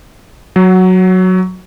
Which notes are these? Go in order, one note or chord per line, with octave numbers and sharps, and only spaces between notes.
F#3